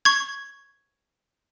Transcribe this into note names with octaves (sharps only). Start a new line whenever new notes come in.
C#6 G#6